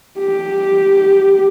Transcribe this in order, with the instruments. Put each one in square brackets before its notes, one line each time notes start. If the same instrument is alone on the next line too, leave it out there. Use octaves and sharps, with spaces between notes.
[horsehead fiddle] G4